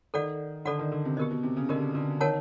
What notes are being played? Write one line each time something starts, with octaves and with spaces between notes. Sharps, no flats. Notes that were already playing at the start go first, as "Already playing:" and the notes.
D#3 A4 D5 F#5
D3 A4 D5 F#5
D#3
D3
C3
B2 G4 A#4 D#5
B2
C3
C#3
D3 G4 A#4 D#5
D3
D#3 A#4 C#5 F#5 A5